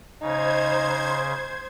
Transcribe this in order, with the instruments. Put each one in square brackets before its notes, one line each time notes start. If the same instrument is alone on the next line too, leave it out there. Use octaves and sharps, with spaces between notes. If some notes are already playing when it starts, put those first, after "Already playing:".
[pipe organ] C#3 [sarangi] D#4 [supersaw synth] C5 G#6